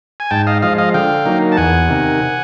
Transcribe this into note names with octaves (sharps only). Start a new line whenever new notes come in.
G#5
G#2 G5 A5
D#5 F5
F3 G#3 D#5 F5
D#5 F5
D3 F5 G5
F#3 A#3 D#4
A5
E2 F#5 G#5
C3 D#3